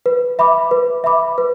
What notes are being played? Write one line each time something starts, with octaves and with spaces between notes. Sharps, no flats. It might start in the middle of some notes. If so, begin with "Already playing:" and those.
B4
E5 B5 D6
B4
E5 B5 D6
B4